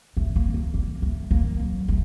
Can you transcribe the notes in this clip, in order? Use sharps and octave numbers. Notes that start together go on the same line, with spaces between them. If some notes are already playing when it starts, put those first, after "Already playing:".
A3
A#3
A3
A#3
A3
A#3
F#3
A3